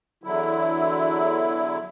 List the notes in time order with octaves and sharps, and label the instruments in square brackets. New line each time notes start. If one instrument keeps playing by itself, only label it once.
[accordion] E2 D3 F#3 E4